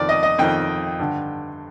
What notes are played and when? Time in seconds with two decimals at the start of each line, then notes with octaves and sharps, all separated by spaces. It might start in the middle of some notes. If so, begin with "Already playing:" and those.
Already playing: F2 D#3 D5
0.09 D#5
0.23 D#5
0.38 F2 D#3 G5
0.99 G2 D3